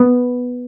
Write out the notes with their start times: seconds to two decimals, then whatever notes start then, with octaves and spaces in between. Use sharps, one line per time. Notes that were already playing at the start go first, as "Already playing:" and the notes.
Already playing: B3